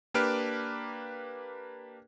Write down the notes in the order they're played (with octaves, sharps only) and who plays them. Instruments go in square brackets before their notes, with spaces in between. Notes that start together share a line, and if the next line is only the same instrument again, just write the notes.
[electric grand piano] A#3 D4 G4 B4 F6 D7